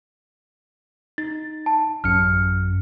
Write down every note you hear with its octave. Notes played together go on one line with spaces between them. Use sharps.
D#4 A6
A5
A1 F#2 F6 C#7